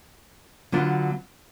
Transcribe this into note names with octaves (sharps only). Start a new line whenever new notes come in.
D3 F#3 B3 D4 F4